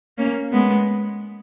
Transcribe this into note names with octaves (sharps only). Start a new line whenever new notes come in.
A#3 C#4
G#3 B3